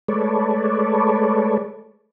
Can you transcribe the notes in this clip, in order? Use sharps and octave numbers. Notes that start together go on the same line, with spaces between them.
G#3 A3 A4 B4 C#5 D5